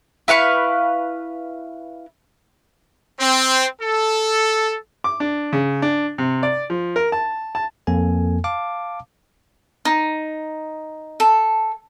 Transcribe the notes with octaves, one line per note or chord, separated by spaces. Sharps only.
E4 B4 F5 C#6
C4
A4
D6
D4
C#3
D4
C3
D5
F3
A#4
A5
A5
F2 A#3 A4 G#5
F5 A5 D6
D#4
A4